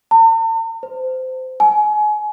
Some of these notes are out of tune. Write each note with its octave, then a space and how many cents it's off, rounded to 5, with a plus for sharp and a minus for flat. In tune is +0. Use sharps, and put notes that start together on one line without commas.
A5 +45
C5 -20
G#5 +30